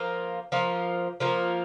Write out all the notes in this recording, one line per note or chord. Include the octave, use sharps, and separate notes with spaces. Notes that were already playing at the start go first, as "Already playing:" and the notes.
Already playing: F3 A#3 F4
F3 A#3 F4
F3 A#3 F4